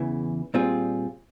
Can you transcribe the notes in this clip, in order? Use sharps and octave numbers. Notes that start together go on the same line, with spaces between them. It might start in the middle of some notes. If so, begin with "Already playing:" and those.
Already playing: E2 C#3 E3
A#2 G3 C4 F4 G#4